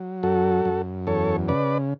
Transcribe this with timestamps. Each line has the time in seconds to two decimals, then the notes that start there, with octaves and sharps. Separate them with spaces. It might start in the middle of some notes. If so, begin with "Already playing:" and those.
Already playing: F#3
0.23 F#2 F#4 A4
0.65 F#2
1.07 E2 A4 C#5
1.48 C#3 B4 D5